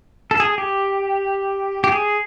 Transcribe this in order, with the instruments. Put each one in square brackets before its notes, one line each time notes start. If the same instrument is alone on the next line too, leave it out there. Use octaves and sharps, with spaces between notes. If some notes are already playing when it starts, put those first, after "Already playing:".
[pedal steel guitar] A4
G#4
G4
G4
G#4